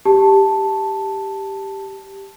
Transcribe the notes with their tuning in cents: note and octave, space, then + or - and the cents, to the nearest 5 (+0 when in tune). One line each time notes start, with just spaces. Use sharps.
G4 +0 A5 +0